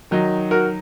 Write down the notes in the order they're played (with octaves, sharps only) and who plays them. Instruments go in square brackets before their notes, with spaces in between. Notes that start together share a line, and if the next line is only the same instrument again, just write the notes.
[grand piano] D#3 F#3 D#4
F#4 A#4